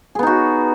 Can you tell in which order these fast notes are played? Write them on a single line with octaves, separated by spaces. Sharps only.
G#4 B3 D#4 F#4